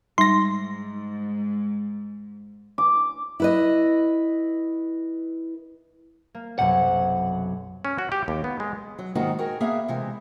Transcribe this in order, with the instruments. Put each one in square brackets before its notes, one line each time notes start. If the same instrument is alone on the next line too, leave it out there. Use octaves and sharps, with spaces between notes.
[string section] G#2 [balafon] G3 D#4 [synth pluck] C6 A#6
[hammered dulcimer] D6
[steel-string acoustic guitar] E4 B4 D#5
[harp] A#3
[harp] B1 F#2 C3 [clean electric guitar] F#5
[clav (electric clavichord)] C#4
F#4
G4
D#2
B3
G#3
[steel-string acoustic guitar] F#3
G#2 D#3 A#3 B3 D#4 F#4
F#4 G#4 A#4 G5
A#3 B3 G#4 E5 F5
C3 E3 G#3